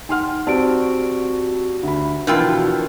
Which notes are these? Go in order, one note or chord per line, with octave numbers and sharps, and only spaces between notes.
D#4 F#5 G5 C6 F6
C4 F#4 G4 D5 A5 D7
D2 B5
B2 E3 F3 D4 F4 A#4 G5 E6